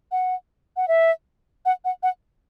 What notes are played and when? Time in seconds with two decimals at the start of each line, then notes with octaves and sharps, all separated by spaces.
0.12 F#5
0.76 F#5
0.88 E5
1.65 F#5
1.85 F#5
2.03 F#5